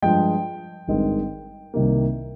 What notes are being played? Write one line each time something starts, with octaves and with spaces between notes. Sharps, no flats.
G2 F3 G#3 G5
G#1 G2 D#3 G#3 C4
C2 C3 D#3 A#3